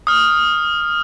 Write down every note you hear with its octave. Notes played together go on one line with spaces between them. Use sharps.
D#6 F6